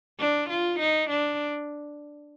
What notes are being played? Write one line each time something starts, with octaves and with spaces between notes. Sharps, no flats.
D4
F4
D#4
D4